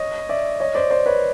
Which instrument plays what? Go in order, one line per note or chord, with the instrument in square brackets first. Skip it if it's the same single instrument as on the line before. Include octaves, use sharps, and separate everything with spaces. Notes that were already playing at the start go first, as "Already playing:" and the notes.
Already playing: [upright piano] C#5 D#5
D5 E5
C#5 D#5
C5 D5
C5 D5
B4 C#5